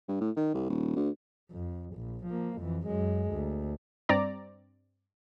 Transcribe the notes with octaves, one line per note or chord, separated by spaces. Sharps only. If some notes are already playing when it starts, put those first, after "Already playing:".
G2
A2
D#3
C2
D#1
D2
F2
A#1
F3 A#3
F2 E3
F#2 G#3
D2
G2 C4 D5 A#5